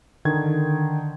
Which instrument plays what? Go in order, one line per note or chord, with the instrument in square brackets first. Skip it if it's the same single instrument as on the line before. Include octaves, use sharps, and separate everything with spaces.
[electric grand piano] D3 D#3 G#6